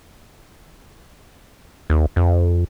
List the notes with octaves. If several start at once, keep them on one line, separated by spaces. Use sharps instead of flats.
D#2
F2